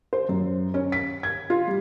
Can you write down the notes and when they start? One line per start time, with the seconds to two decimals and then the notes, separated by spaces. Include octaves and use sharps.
0.13 C5
0.29 F#2
0.74 C#4
0.92 B6
1.23 G#6
1.50 F4
1.67 G3